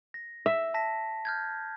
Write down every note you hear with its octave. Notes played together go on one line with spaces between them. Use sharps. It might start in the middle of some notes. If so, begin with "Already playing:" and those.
A#6
E5
A5 A#6 B6
F6 G6 G#6